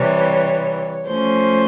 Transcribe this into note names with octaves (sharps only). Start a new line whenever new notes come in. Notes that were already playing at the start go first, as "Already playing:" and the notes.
Already playing: C3 E3 G3 C#5
F3 A3 C#4 C5